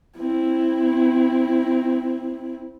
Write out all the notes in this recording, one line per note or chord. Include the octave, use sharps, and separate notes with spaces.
C4 E4